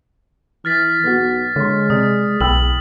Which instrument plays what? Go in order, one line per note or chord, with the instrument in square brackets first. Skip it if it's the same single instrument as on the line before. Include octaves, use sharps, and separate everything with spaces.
[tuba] E3 [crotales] F6 A6 B6
[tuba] B1 [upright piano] B3 F#4
[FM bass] D3 [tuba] G#3 [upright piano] C#5 C6
[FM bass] C3 [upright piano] D5 [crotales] D#6
[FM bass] B1 [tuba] E2 [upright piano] G5 B5 E6 [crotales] F#7